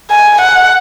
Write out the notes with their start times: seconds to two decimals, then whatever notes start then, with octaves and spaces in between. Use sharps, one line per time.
0.10 G#5
0.41 F#5